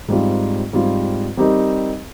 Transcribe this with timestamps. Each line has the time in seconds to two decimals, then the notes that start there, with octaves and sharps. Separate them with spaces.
0.08 G#2 G3 C4 F4
0.73 G#2 G3 C4 F4
1.37 G3 C4 D#4 G4 A#4